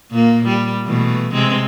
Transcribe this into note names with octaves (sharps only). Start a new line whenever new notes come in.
A#2 A#3
G3
B2 E3 A3
C3 G#3 C4